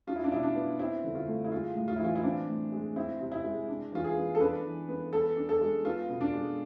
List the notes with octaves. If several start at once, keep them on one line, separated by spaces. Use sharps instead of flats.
D4 F4
E4
D4
B2 E4
D4
B3
C4 E4
D3
F4
A3
E4
G#3 F4
A2
F4
E4
E3 F4
E4
C4 D4
A2
G#3
C4 E4
C3
E4
G#3
D4
E3 F4
G#4
B3
A4
D4 B4
E3
B3
B3 A4
D4
A4
G#3
B3 F4
B2
D4
G#3